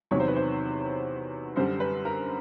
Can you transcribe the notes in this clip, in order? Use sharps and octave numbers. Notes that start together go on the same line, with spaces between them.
E2 C3 D#3 F#3 C#5
C5
B4
C5
F#2 D3 G3 C5
B4
A#4